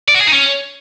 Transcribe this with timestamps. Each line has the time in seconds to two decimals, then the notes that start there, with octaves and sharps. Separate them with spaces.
0.08 D5
0.15 F#4
0.21 G#4
0.27 D#4
0.33 C#4